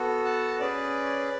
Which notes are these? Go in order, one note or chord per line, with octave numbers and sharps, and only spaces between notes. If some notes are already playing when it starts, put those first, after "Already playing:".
Already playing: B3 F#4 A4
F#5 A5
C#4 G#4 B4 D5